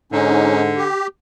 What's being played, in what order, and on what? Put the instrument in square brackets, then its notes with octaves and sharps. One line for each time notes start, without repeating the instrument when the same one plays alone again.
[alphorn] G#2 [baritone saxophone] D3 [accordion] C#4 D#4
[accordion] G4